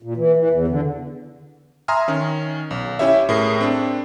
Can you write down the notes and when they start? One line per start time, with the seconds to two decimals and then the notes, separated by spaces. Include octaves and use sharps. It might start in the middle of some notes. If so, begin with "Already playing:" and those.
0.03 A#2
0.17 E3
0.37 E3
0.50 E2
0.67 D3
1.88 E5 G#5 A#5 C6 D#6 F6
2.08 D#3 C#4
2.71 B1
2.99 C#4 E4 G4 C#5 E5
3.29 A2 G#4 A#4 C7
3.61 C4 D4